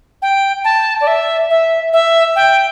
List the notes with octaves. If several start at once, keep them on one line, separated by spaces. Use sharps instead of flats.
G5
A5
D5
E5
E5
E5
G5